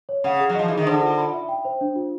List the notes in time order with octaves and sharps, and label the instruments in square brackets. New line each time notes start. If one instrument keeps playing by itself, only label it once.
[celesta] C#5
[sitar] C#3 [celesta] F#5
[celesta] G#4
[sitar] F#3
[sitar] F3 [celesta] D#5
[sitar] E3 [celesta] G#4
[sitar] D#3
[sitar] D3 [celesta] C5
[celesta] F4
B5
E5
G5
C5
D4
F4